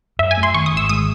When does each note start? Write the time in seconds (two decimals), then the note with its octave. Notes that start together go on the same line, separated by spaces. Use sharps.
0.19 F#2 E5
0.31 G#5
0.37 A3
0.43 C6
0.55 D#3 C#6
0.66 D#6
0.72 G#1 E6
0.89 G#3 D#6